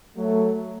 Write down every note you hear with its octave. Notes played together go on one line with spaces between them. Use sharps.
F#3 A3